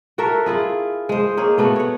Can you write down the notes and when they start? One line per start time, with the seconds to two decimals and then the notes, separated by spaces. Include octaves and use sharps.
0.18 F#4 A4 A#4 E5
0.46 E4 F4 G#4
1.09 G#3 C5
1.37 A#3 G#4 C#5
1.58 A3 B3 F#4
1.76 C#5 F#5